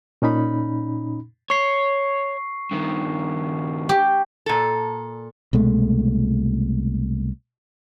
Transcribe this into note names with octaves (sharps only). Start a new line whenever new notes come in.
A#2 C#4 D#4 B5
C#5 C#6 C7
G2 D#3
G4
A#2 A4
C2 B2 G#3 A3